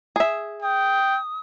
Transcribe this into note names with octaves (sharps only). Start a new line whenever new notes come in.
G#4 E5
G5 D#6